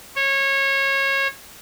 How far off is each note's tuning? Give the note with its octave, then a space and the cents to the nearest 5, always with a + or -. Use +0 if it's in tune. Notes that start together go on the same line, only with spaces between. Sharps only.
C#5 -25